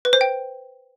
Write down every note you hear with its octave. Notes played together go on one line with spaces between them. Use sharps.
B4
C5
G5